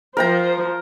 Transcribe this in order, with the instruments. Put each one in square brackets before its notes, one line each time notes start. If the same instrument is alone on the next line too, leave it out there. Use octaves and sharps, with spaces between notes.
[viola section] F3 C5 [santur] A#4 G5 A#5